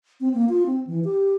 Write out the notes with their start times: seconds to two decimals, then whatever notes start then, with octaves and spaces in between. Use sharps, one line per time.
0.21 C4
0.34 A#3
0.49 F4
0.66 C4
0.87 E3
1.04 G4